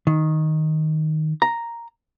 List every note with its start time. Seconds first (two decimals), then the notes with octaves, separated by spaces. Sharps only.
0.07 D#3
1.42 A#5